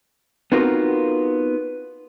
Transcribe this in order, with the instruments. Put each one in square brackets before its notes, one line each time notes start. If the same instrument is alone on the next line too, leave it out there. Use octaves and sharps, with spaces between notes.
[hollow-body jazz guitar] B3 C4 D#4 F4 F#4 A#4